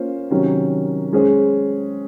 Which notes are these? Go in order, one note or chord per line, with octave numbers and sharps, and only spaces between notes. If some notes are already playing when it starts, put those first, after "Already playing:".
Already playing: A#3 C#4 F4 C5
C3 D#3 F#3 C#4
G#3 C#4 G#4 C5